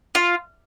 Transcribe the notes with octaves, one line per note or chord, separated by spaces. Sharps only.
F4